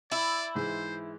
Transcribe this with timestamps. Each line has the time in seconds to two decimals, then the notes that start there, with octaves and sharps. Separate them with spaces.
0.11 E4 D5
0.55 G#2 E3 C5